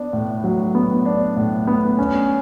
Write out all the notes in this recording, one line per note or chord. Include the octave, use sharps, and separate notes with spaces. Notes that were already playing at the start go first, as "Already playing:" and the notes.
Already playing: B3 D4
A2
F#3
B3
D4
A2
B3
C#4